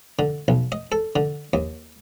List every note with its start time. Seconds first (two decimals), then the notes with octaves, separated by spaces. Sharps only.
0.19 D3
0.48 B1
0.72 D#5
0.92 A4
1.16 D3
1.53 D#2